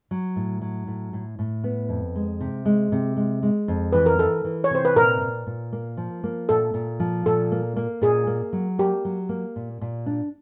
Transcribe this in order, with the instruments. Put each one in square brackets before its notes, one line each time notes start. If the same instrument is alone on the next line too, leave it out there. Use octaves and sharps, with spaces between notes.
[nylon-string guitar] F#3
A2
F#3
A2
A2
A2
B3
F2
G#3
C3
G#3
C3
G#3
G#3
F2
[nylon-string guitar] E3 [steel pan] B4
[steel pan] A#4
[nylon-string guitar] E3 [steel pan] A4
[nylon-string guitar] E3
[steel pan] C#5
[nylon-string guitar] C3 [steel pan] C5
[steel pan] B4
[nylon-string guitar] A#2 [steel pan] A#4
[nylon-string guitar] A#2
A#2
A#3
F3
A#3
[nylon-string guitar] A#2 [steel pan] A4
[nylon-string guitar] A#2
F3
[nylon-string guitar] A#2 [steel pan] A4
[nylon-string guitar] A#3
A#3
[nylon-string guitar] A#2 [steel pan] G#4
[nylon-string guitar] A#3
F#3
[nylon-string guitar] A#3 [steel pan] G4
[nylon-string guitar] F#3
A#3
A#2
A#2
D4